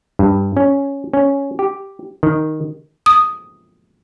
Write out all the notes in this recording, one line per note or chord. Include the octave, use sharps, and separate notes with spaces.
G2
C#4
C#4
G4
D#3
D#6